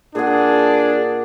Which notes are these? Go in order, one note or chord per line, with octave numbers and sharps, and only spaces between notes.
A#2 D4 G#4 F#5